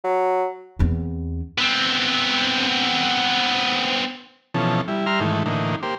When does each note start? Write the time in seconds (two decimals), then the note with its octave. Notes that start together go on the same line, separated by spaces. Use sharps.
0.04 F#3
0.79 E2 C4
1.58 B3 C4
4.54 B2 E3 F3 C#4 A4
4.88 G3 E4
5.06 G3 E5 A#5 C6 F6
5.20 G#2 D#3 E3 A3
5.46 A2 D3 E3 A#3 D#4
5.83 A#3 G4 C5